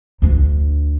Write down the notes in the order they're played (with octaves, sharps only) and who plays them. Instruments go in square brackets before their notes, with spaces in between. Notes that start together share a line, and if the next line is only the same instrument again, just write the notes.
[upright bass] D2 D4